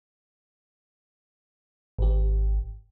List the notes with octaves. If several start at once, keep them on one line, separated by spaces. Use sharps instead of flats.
G#1 G4